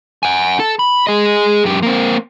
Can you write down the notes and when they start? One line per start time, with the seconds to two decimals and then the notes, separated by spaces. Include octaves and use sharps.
0.23 F#5 G#5
0.60 A4
0.79 B5
1.07 G#4 D#5
1.65 F#2 G4
1.83 A#3 C4